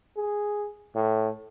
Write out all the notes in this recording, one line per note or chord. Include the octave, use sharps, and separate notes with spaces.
G#4
A2